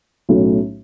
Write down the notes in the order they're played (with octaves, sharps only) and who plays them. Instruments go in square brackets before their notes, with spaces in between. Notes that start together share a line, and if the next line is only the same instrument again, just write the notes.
[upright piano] B1 A2 F#3 A3 C#4